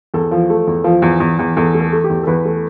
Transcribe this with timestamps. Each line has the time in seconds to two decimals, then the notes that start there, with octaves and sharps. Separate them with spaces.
0.14 E2 A4
0.31 F3
0.50 A3
0.67 E2
0.84 F3
1.02 E2
1.20 E2
1.39 E2
1.57 E2 A4
1.74 A3
1.80 A4
1.92 A3
2.04 G4
2.10 E2
2.23 A4
2.27 E2 B4
2.45 A3